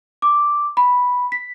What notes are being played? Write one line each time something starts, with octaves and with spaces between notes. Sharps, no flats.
D6
B5
B6